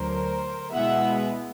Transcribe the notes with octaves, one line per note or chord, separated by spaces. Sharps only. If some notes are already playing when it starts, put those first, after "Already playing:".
Already playing: D2 D3 F#3 A#4 C5
B2 G#3 B3 E4 E5 F#5